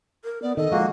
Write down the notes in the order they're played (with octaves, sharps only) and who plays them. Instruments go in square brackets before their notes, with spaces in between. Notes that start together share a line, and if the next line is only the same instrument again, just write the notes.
[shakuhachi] A#4
[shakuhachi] B3 [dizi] D5
[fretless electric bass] D#3 [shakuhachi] A4 [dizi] D#5
[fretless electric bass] F3 G#3 [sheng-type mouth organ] A#3 F#4